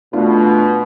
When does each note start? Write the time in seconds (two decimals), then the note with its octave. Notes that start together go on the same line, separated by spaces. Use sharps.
0.13 B2 A3 D4 F4